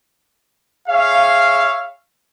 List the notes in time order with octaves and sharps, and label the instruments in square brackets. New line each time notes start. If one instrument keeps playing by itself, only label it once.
[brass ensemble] G#4 C#5 E5 F5